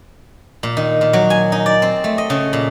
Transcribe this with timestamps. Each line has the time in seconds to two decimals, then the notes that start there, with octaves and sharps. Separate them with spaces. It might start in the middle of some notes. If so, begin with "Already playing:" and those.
0.63 A#2
0.77 D#3
1.01 A#2
1.13 F#3
1.30 G#5
1.52 D#4
1.66 D5
1.82 C4
2.04 A3
2.18 D#5
2.30 C#3
2.53 A#2